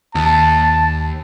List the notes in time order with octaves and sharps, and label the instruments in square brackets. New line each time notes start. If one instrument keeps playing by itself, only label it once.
[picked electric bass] D#2 [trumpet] A5